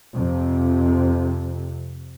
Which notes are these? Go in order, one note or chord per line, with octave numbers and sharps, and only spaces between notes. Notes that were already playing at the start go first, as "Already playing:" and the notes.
F2 C3